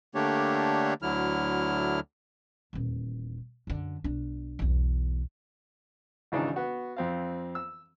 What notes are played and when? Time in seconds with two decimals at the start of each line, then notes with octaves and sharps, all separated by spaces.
0.15 D3 A3 A#3 D4 G4 C#5
1.02 D2 D3 F#3 E4 F6
2.73 D#1 E2
3.67 F#2 D3
4.04 B1 D4
4.59 B1 E2
6.32 G#1 C#3 E3 D4 D#4
6.56 B3 F#4
6.96 F2 C4 F5
7.55 E6